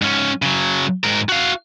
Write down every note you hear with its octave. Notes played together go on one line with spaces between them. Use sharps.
G#2 C#4
C#3 F#3
G#2 A#4
F#4 F5